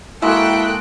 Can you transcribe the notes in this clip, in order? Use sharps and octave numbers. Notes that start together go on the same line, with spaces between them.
G#3 A#3 E4 F#4 A4 G5 F#6